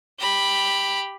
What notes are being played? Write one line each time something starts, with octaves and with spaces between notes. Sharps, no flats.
G4 B5